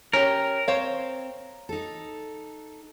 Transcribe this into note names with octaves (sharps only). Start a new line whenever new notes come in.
C#4 G4 A#4 C#5
C4 C5 C#5 F5
D#4 A4